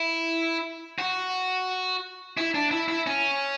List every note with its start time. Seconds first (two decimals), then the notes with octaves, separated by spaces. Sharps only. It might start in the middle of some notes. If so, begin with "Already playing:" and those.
Already playing: E4
0.99 F#4
2.37 E4
2.55 D4
2.71 E4
2.88 E4
3.07 C#4